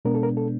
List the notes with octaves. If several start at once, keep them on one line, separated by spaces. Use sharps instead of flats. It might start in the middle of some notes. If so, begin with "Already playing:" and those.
B2 G#3 B3 D4 A#4
A4
A#4
A4